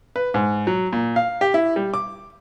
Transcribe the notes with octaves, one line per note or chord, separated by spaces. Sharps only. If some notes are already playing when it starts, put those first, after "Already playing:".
B4
G#2
F#3
A#2
F5
G4
E4
G3
D6